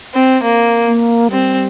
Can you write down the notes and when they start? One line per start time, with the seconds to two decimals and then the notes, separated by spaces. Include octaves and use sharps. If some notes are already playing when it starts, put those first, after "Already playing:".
0.14 C4
0.43 A#3
0.87 A#3
1.31 G3 C4